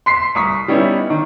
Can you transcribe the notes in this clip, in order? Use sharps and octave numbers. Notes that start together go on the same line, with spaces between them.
C6 B6 C7
C2 C#6 D#6 B6
G3 B3 C#4 D#4 E4
D#3